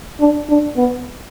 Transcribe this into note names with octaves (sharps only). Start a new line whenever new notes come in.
D4
D4
B3